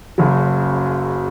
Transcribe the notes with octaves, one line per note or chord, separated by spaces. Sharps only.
F#1 F#2 C#3 F#3